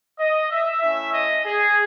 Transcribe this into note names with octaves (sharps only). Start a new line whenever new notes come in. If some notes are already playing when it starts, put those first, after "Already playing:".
D#5
E5
A3 C#4 E4 E5
D#5
G#4